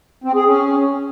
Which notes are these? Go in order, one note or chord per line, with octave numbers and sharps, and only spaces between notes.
C4
G#4
C#4